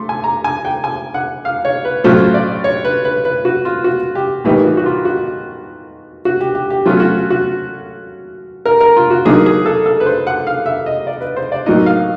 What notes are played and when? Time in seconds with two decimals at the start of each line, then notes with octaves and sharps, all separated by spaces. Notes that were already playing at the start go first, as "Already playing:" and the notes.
Already playing: A3 C6
0.09 G#5
0.24 A#5
0.44 G#5
0.65 G5
0.84 G#5
1.14 F#5
1.45 F5
1.65 C#5
1.85 B4
2.04 A2 F#3 A3 C#4 F4 C5
2.34 D5
2.64 C#5
2.85 B4
3.05 B4
3.25 B4
3.45 F#4
3.65 F4
3.84 F#4
4.15 G4
4.44 A2 E3 G3 A#3 D#4 G4
4.64 F#4
4.77 F#4
4.86 F4
5.05 F#4
6.25 F#4
6.41 G4
6.55 G4
6.70 G4
6.86 F#3 A3 C#4 F4
7.00 F#4
7.30 F#4
8.66 A#4
8.80 A#4
8.96 F4
9.10 F#4
9.25 D3 F#3 A#3 D#4 G#4
9.46 G#4
9.66 A4
9.86 A4
10.00 B4
10.06 C5
10.27 F#5
10.47 F5
10.66 E5
10.86 D#5
11.07 D5
11.21 B4
11.37 C5
11.52 D5
11.66 A2 F#3 A#3 D#4 D#5
11.86 F5